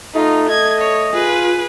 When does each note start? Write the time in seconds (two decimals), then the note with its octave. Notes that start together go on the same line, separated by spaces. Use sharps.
0.15 A3 D#4 F4
0.49 D#5 G#6
0.82 C#5
1.13 F4 G#4 B4